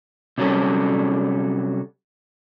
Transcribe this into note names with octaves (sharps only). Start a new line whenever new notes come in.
C3 F#3 G3 C#4 A4